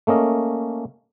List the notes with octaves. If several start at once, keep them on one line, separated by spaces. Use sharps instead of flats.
A3 A#3 C#4 D#5